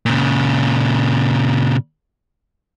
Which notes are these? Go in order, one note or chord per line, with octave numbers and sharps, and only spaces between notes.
A#2 C#3